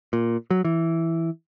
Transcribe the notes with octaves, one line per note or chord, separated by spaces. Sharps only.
A#2
F#3
E3